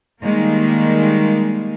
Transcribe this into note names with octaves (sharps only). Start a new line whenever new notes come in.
D#3 G3 G#3 A#3